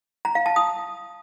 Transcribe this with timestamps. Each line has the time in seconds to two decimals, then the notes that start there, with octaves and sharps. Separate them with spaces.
0.25 A#5
0.35 F5
0.46 A5
0.56 D#6